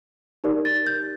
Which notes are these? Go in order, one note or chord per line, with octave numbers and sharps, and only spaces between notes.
D#4 G4 A#4 D5
A6
G6